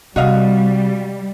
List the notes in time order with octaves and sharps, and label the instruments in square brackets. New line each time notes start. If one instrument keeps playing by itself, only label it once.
[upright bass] C3 [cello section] G3 [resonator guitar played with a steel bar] F#4 D#5 F5